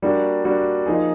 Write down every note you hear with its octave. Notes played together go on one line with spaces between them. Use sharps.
G3 A#3 D4 F#4
G3 A#3 D4 F#4
F3 A#3 D#4 G#4